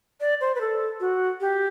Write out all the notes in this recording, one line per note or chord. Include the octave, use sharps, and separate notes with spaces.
D5
C5
B4
A4
F#4
G4